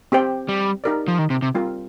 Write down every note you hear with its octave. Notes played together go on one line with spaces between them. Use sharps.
C4 G4 C5 G5
G3
D#4 G4 A#4 D5
F3
D#3
C3
C3
G3 C4 F4 A#4